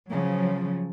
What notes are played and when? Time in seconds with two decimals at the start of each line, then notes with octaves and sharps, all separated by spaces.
0.11 C#3 F3 F#3